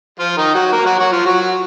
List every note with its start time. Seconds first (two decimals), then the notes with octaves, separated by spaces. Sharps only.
0.19 F3 F4
0.37 D#3 D#4
0.55 F#3 F#4
0.72 A#3 A#4
0.85 F#3 F#4
0.99 F#3 F#4
1.12 F3 F4
1.25 F#3 F#4